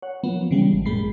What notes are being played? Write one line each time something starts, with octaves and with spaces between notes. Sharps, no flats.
C#5 F#5
F3 F#3 A#3 B3
C#3 E3 G3 G#3
G#1
F#2 A#2 G#3 B5 C7